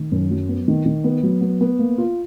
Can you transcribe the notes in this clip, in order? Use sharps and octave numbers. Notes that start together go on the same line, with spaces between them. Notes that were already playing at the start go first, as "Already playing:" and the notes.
Already playing: D#3
F#2
F#3
B3
D#3
D#3
B3
F#3
B3
B3
A#3
F4